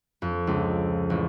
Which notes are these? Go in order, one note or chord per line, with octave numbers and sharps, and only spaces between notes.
F2
C#2
A1